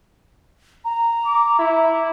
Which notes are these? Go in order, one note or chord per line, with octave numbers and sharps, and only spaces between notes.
A#5
D6
E4